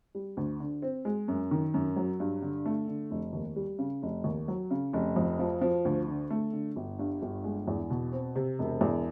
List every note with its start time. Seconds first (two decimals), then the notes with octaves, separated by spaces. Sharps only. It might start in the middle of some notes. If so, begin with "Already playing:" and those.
0.15 G3
0.37 D2
0.60 D3
0.82 C4
1.05 G#3
1.28 F#2
1.51 D#3
1.74 F#2
1.96 F#3
2.20 G2
2.42 D3
2.66 A3
2.88 D3
3.11 F1
3.33 D#2
3.56 G3
3.79 C#3
4.03 F1
4.24 D#2
4.48 F#3
4.71 C#3
4.93 F1
5.16 F2
5.39 F3
5.61 F3
5.85 D2
6.08 D3
6.30 A3
6.53 D3
6.76 G1
6.99 G2
7.22 G1
7.44 G#3
7.68 E2
7.90 B2
8.12 C4
8.36 C3
8.59 E1
8.81 E2